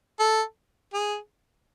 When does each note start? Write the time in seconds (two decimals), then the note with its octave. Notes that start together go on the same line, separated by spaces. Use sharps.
0.19 A4
0.93 G#4